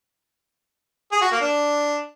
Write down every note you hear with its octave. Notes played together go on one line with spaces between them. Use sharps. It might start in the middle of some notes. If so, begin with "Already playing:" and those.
G#4
F#4
A#3
D4